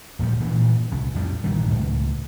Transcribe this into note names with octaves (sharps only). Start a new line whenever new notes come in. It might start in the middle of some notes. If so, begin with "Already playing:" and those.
D1 A#2 F3 G3
G2 A#2 E3
C2 C#3
F2 A2 G3
A#1 G2 D#3 E3
C#2 A2